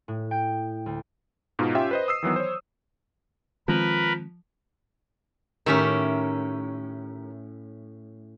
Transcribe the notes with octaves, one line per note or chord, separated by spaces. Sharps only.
A2
G5
D2
G#2 B2 D#4 F4
C#4 F4 G4 E5 G5
B4 C5 D#5
D#6 E6 C7
D#3 E3 F#3 B3
C5 C#5
D#3 F3 G#3 C4 A#4 B4 B5
A2 D#3 C#4 G4 A#4 E5